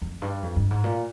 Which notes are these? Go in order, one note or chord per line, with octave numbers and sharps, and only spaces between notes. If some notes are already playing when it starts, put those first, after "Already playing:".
F2
G2
F2
G2
G#2
A#2